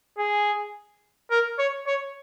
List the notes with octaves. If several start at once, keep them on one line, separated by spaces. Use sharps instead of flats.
G#4
A#4
C#5
C#5